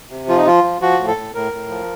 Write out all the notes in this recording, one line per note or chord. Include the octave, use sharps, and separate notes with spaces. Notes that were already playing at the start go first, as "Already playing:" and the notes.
C3
F3 F4
D#4
F3 F4
F3
F3 F#4
A2
A4
A2
A2 A#4
A2
F3